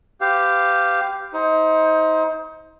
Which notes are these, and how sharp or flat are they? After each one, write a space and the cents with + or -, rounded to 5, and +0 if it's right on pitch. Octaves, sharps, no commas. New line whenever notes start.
G4 +0 B4 +40 F5 +0
D#4 +30 C5 +0